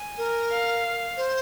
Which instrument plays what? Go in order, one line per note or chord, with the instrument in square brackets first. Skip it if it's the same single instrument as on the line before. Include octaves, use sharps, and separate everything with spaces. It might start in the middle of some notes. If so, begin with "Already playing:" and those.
Already playing: [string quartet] G#5
[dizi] A#4
[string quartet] F5
[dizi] C5